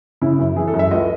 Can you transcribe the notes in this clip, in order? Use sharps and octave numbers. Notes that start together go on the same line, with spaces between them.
C#3 E4
F#2
E3 G#4
A4
F#2
E5
C#2 D#5